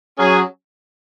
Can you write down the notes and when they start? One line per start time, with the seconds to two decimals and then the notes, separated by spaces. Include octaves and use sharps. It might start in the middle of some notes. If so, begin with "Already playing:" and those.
0.19 F#3 C#4 G#4